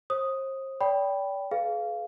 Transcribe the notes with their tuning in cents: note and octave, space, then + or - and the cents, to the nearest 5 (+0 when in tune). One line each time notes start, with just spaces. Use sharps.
C5 +40 D#6 +0
D5 -35 G5 +0 B5 +0
G#4 +40 B4 +0 F5 -5